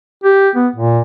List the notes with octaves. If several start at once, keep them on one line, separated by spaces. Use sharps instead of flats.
G4
B3
A#2